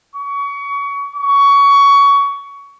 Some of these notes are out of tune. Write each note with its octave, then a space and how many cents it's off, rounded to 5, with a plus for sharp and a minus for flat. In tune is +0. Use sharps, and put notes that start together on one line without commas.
C#6 +30
C#6 +20